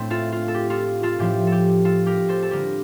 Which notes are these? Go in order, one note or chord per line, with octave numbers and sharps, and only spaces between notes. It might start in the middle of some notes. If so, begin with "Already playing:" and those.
Already playing: A2 A3 C4
F4 A4
F4
A4
G4
F4 A4
F4 A4
A2 F3 C4 G4
G4 A4
F4 A4
G4 A#4
A4 C5
A4
D3 G3 C4 G4 A#4